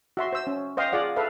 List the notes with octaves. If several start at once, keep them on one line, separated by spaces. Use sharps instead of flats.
F#4 E5 C6
C5 E6
C#4
C5 D#5 F5 G5 C6
F4 G#4 D5 F#5
A4 B4 E5 F5